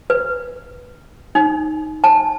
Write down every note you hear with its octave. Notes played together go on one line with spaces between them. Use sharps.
B4
D#4
A5